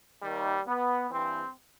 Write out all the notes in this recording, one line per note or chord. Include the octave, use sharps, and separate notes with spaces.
D#2 D#3 G3
B3
G2 E3 C4